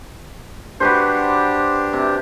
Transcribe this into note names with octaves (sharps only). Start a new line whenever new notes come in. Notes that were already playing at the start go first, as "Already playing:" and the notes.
D4 F#4 G4 B4 C5
C3